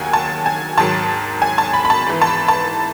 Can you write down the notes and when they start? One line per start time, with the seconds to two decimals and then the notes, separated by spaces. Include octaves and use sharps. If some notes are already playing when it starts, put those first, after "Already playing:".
Already playing: D#2 D#3 F#3 F#5 G#5
0.13 A5
0.46 G#5
0.78 G#2 D#3 F#3 A5
1.42 G#5
1.58 A5
1.74 B5
1.85 B5
1.90 A5
2.06 G#2 E3
2.22 A5
2.27 B5
2.48 A5